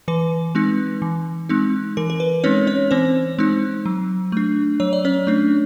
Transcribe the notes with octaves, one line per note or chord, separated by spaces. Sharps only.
E3 B4
G#3 C4 D#4
E3
G#3 C4 D#4
E3 A#4
A#4
B4
G#3 C4 C#4 D#4 C#5
C#4 C#5
E3 C4 C5
G#3 C4 D#4
F#3
A3 D4
F#3 C#5
D5
C#4 C#5
A3 D4